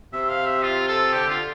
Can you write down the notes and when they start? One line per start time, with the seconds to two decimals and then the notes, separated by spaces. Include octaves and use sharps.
0.13 C3 E5
0.29 F5
0.46 E5
0.63 F4
0.88 A4
1.13 D3 G4
1.29 F4